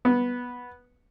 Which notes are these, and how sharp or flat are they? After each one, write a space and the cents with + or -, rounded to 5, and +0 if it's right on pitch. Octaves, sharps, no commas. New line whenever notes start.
B3 -10